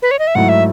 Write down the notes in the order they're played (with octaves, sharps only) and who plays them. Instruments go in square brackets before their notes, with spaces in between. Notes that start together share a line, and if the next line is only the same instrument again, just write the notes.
[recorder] B4
C#5
D#5
E5
[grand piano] G#2 F#3 A3 E4 [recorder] F#5
[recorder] E5